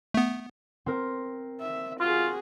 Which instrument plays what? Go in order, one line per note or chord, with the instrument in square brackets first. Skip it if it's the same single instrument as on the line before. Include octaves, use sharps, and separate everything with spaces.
[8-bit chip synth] A3 B3
[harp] C4 A#4
[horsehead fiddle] E5
[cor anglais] F4 [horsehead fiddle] F#4 G#4